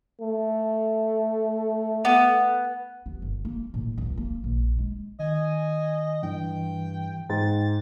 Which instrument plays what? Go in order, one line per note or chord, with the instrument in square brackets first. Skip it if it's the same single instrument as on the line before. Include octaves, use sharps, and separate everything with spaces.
[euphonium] A3
[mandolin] B3
[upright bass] D#2
G1
A#3
A2
C#2
A#3
A#1
G#3
[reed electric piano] D#3 [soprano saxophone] D#5 [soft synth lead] G#5
[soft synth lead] G2 [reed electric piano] E3 [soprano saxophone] G5
[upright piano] G#2 [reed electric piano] G5 [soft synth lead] A6